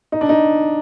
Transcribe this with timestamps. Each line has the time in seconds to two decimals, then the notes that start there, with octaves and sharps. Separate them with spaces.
0.12 D#4
0.21 D4
0.29 D#4